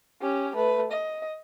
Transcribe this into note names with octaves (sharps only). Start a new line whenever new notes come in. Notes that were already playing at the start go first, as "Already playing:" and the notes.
C#4 G4
A3 B4
D#5